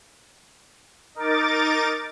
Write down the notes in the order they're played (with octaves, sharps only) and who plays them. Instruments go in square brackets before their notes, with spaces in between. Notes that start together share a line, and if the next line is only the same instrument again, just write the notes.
[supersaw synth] D#4 A#4 D6 A6